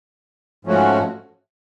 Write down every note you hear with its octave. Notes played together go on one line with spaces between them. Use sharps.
G#2 F3 A3 C#4 F#4